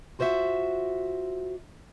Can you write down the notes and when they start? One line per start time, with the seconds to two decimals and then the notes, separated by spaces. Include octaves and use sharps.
0.19 F4 F#4 C5 D#5 E5 F#5